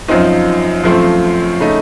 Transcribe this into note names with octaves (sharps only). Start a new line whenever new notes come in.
F#2 F3 C4 D#4
F#2 F3 A3 C4
C#3 A3 D#4